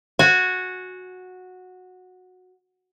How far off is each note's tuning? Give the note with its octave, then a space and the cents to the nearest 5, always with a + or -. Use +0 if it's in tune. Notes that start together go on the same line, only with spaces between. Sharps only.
F#4 -10 G#5 +0